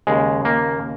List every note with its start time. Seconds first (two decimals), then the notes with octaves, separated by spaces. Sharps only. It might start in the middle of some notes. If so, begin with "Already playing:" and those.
0.07 D#2 C#3 G#3
0.45 A#3